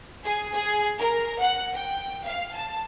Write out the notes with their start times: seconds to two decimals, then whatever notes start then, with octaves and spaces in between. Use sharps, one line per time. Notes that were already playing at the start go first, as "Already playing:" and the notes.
0.24 G#4
0.54 G#4
0.98 A#4
1.39 F#5
1.73 G5
2.25 F5
2.53 A5